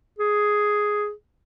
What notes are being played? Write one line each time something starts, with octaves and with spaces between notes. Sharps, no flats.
G#4